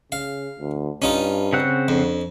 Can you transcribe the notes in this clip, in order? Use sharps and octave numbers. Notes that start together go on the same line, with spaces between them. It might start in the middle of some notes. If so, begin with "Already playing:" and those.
C#3 F5
D2
G2 C#4 D#4 F4
C#3 C4 F#5
F2 D4